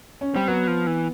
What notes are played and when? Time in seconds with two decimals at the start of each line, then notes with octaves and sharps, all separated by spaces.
0.21 C#4
0.34 G3 C4
0.48 F#3 B3
0.67 F3
0.87 E3